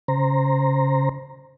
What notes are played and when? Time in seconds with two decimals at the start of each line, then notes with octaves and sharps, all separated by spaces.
0.08 C#3 C5 A#5